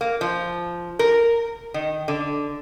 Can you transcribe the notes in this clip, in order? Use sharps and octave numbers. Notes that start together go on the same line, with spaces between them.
A#3
F3
A#4
D#3
D3